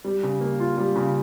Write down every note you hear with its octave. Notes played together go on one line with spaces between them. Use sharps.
G3
C#3
A#3
F4
G3
C#3